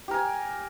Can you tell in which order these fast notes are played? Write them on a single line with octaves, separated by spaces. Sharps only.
G4 A#4 G#5